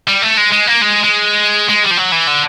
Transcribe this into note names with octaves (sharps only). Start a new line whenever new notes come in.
G3
A3
G#3
G#3
A#3
G#3
G#3
G#3
G3
F3
F#3
E3
D3